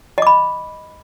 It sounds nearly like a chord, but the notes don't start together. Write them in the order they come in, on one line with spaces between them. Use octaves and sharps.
D#5 D6 B5